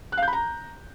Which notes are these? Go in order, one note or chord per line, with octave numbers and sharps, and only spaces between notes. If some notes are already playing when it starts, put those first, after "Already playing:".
F#6
F5
G6
B5
A#5